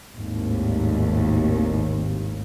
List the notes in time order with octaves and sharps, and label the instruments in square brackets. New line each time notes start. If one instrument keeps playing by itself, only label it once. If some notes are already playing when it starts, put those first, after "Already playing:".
[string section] G#1 D#2 A2